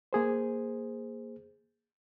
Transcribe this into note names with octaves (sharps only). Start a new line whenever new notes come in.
A#3 G#4 C5